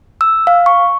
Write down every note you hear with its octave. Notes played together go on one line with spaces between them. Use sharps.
E6
F5
C#6